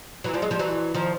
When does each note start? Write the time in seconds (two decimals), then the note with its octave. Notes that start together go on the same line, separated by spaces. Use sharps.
0.24 E3 F#3
0.33 F3 G3
0.42 F#3 G#3
0.51 F3 G3
0.59 E3 F#3
0.94 D#3 F3